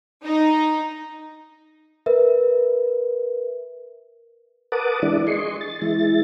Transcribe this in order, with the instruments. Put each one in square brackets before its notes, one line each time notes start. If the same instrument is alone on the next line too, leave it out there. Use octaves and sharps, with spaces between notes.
[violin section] D#4
[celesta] A#4 B4 E5
[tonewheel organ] A#4 B4 F#5 A5 D6 D#6
E3 G#3 D4 E4 D5
G#4 D#5 C6 C#6
A6
E3 G#3 E4 A6